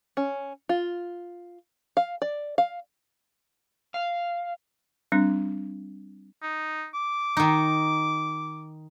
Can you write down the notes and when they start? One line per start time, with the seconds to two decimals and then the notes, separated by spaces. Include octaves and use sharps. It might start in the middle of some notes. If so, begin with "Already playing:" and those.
0.17 C#4
0.69 F4
1.97 F5
2.22 D5
2.58 F5
3.94 F5
5.12 G3 C4 D4
6.42 D#4
6.94 D6
7.37 D#3 D#4